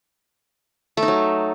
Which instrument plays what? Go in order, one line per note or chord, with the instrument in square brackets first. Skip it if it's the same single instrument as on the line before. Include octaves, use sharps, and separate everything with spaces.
[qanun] A3
D#4
F#3